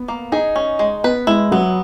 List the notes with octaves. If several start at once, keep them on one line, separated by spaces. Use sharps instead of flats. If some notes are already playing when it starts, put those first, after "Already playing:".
Already playing: B3
A#3
D#4 G#4
C#4
G#3
B3 B4
G#3 E4
F#3 B3